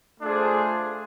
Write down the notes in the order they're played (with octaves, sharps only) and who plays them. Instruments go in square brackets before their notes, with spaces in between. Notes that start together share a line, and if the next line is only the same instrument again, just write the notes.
[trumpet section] A3 D4 F4 G#4 C5